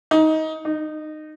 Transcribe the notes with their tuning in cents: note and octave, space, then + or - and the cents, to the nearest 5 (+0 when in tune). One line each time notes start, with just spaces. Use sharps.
D#4 +20
D#4 -20